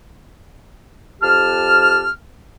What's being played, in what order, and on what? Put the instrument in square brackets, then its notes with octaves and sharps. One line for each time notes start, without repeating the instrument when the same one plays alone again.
[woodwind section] F2 G4 A5 F6